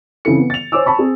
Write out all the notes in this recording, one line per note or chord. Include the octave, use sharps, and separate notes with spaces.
C#3 E3 C4 E4 A4 C#7
B3
A6 F7
C5 C#5 G#5 D6 E6
A5 B5 C#6
C4 G#4